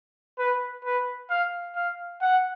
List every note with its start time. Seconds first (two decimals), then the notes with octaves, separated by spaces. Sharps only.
0.38 B4
0.84 B4
1.30 F5
1.76 F5
2.22 F#5